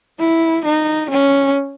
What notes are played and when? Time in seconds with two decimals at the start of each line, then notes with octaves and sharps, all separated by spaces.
0.19 E4
0.65 D#4
1.10 C#4